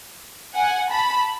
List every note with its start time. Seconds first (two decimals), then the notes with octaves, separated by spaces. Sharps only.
0.55 F#5 G#5
0.90 A5 B5